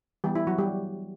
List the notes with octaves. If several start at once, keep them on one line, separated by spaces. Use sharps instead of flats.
E3 G3 B3 G4
E4
F#3 F#4
G3 G4